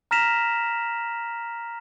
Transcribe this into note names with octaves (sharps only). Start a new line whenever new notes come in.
A#5 F6 A#6 B6 E7 F7